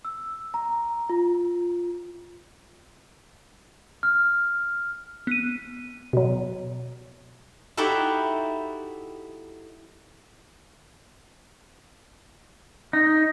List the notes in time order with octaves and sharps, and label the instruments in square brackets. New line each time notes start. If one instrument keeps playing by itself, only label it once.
[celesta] E6
A#5
F4
[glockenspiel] F6
[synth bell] B3 D#7
[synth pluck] B2 F#3
[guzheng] D#4 E4 F#4 G4 A4 E5
[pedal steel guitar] D#4